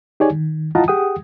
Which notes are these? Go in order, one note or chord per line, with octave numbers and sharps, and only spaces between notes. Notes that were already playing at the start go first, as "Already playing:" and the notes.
D#4 G4 G#4 C#5 D5 G#5
D#3
E4 F4 D#5 F#5 A5 A#5
G4 G#4 F#5 G5 D#6